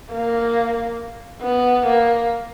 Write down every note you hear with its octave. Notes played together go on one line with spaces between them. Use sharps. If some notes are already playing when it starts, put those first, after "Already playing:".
A#3
B3
A#3